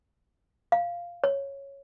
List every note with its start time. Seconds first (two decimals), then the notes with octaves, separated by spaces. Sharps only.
0.72 F5
1.24 C#5